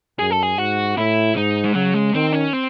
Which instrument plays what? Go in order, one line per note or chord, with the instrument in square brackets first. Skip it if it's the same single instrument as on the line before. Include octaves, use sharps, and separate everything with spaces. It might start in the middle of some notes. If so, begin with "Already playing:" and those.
[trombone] F#2 [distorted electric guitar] G#4
[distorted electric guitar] A4
G#4
[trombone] G#2 [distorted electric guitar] F#4
[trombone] A2 [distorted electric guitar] E4
[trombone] G#2 [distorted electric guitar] D#4
[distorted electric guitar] G#3
[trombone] C#3 [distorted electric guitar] F#3
[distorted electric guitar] G#3
[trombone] D#3 [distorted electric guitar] C4
[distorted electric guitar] C#4
C4